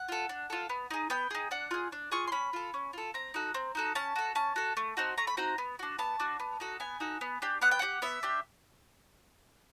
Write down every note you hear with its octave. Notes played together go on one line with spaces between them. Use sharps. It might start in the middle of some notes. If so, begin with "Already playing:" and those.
Already playing: F#5
F4 A4
D4
F4 A4
B3
D#4 G#4
B3 G5
D#4 G#4
D4 F#5
F4 G#4
D4
F4 G#4 C#6
C6
C#4 B5
F4 A4
C#4
F4 A4
C4 A#5
D#4 F#4 A4
C4
D#4 F#4 A4
C#4 A5
F#4 A4
C#4 A5
F#4 A4
A3
C4 D#4 F#4
A3 A#5
B5
C4 D#4 F#4 A#5
B3
D4 F#4
B3 A5
D4 F#4
B3
D#4 F#4 A4
B3 G#5
D#4 F#4 A4
B3
D4 G4
B3 F#5
G5
D4 G4 F#5
B3 E5
D4 G4